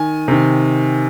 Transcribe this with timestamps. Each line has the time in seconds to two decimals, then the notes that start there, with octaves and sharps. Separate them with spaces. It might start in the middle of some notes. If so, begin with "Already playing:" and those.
Already playing: D#3 G#5
0.28 C3 D#3